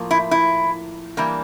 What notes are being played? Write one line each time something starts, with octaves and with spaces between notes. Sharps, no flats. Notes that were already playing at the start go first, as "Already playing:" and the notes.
Already playing: A2 F3 A#3
E4
E4
E3 G3 A#3 D4